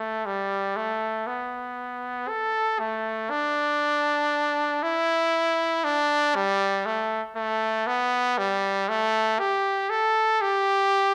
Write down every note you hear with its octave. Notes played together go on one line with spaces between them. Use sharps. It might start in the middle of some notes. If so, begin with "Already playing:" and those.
Already playing: A3
G3
A3
B3
A4
A3
D4
E4
D4
G3
A3
A3
B3
G3
A3
G4
A4
G4